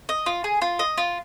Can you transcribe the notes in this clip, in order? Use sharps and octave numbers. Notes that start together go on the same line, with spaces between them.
D#5
F4
G#4
F4
D#5
F4